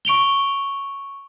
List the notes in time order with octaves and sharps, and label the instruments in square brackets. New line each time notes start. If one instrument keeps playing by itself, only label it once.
[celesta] C#6 D7 F7 G7